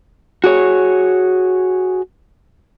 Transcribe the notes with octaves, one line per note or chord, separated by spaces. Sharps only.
F#4 G#4 C#5